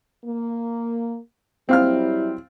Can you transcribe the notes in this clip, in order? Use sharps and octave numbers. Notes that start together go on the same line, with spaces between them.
A#3
F#3 G3 C4 E4 F5 F6